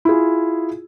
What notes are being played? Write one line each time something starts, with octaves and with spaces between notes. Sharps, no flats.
E4 F4 G#4